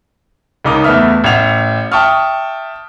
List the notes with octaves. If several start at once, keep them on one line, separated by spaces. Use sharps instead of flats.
C#2 C#3 D#4 A#4 D6
E2 A3 B3 E5 F6
A1 E5 F#5 F7
E5 G5 A5 C#6 D#6 F6